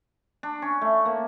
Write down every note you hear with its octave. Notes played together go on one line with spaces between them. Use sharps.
D4
C#4
A3
A#3